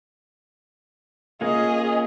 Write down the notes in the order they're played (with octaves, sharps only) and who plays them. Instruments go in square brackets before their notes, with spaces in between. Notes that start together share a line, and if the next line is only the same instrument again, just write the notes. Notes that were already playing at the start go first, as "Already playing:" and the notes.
[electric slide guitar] A#3 C#4 F4 [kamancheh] G#4 D#5